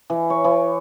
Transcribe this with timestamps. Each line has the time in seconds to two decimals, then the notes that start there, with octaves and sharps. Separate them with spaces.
0.10 E3
0.30 C#5
0.44 E3